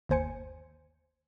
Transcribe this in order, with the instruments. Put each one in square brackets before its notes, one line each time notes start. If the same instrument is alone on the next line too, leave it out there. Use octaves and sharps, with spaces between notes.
[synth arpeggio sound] G1 D#2 C5 G#5 C#7